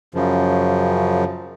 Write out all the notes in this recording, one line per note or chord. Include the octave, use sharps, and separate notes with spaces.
F#2 C#3 F3